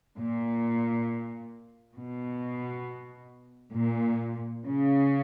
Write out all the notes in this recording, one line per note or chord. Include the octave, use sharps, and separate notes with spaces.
A#2
B2
A#2
C#3